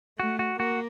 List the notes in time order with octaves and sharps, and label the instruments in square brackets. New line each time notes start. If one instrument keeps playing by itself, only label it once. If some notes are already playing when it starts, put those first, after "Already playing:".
[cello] A3 [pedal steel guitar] F#4
[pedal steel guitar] F#4
[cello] A#3 [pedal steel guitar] F#4